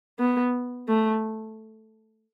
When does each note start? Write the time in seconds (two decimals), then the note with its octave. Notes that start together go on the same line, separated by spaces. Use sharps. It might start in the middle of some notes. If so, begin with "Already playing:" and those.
0.20 B3
0.88 A3